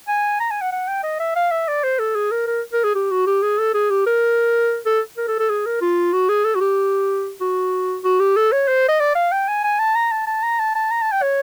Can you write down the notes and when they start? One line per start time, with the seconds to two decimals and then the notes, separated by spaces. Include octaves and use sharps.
0.08 G#5
0.40 A#5
0.51 G#5
0.61 F#5
0.72 F#5
0.88 G5
1.03 D#5
1.20 E5
1.36 F5
1.51 E5
1.68 D5
1.83 C5
1.99 A4
2.15 G#4
2.31 A#4
2.47 A#4
2.73 A#4
2.84 G#4
2.95 G4
3.11 F#4
3.27 G4
3.43 G#4
3.59 A4
3.74 G#4
3.90 G4
4.06 A#4
4.86 A4
5.18 A#4
5.28 A4
5.39 A4
5.50 G#4
5.66 A#4
5.82 F4
6.13 F#4
6.29 G#4
6.45 A4
6.55 F#4
6.61 G4
7.41 F#4
8.04 F#4
8.20 G4
8.36 A4
8.52 C#5
8.68 C5
8.88 D#5
9.00 D5
9.15 F5
9.32 G5
9.48 G#5
9.64 G#5
9.79 A5
9.95 A#5
10.11 A5
10.27 A5
10.43 A#5
10.59 A5
10.75 A5
10.91 A#5
11.02 A5
11.12 G5
11.22 C#5